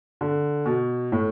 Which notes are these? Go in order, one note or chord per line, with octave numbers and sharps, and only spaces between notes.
D3
B2
A2